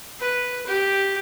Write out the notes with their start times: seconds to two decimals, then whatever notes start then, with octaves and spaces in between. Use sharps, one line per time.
0.19 B4
0.66 G4